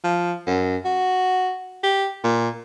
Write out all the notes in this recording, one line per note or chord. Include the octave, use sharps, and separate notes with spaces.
F3
F#2
F#4
G4
A#2